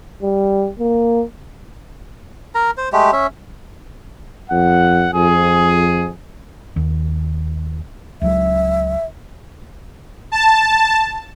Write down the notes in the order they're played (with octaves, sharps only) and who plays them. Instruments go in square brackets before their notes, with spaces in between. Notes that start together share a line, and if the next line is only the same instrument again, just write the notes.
[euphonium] G3
A#3
[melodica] A#4 A#5
C5
G#3 A3 G4
C#4 E5
[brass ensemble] F2 F#5
F2 G#4
[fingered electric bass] D#2
[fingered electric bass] C#2 F#3 [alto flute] E5
[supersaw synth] A5